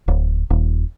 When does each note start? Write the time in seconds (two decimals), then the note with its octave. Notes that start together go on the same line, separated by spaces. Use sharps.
0.08 D1
0.50 D#1